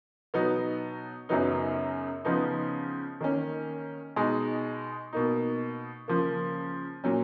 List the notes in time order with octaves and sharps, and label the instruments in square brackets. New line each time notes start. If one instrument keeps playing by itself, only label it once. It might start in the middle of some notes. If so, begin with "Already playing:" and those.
[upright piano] B2 F#3 B3 D#4
F#2 C#3 F#3 B3 D#4
C#3 F3 B3 D#4
D#3 A#3 C#4
B2 G#3 D#4
B2 A#3 D#4
C#3 F3 A#3
A#2 F#3 C#4